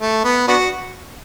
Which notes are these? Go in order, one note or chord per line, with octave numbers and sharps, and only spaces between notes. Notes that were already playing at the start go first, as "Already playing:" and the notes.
A3
B3
B3 D4 F#4